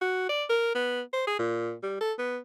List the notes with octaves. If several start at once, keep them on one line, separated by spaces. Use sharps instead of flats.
F#4
D5
A#4
B3
C5
G#4
A#2
G3
A4
B3